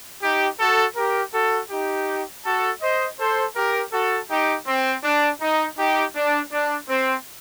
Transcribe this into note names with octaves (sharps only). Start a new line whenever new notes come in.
D#4 G4
F#4 A4
G4 A#4
F#4 A4
D#4 G4
F#4 A4
C5 D#5
A4 C5
G4 A#4
F#4 A4
D#4 G4
C4
D4
D#4
D#4 G4
D4
D4
C4